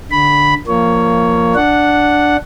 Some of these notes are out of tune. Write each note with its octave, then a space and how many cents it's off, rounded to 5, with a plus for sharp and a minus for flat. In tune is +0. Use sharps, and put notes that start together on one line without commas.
D3 +0 B5 +0
F3 -10 A#3 -5 C#5 +15
D4 +0 F#5 +0